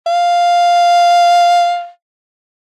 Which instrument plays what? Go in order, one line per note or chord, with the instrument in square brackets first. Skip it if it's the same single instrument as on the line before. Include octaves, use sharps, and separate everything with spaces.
[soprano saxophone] F5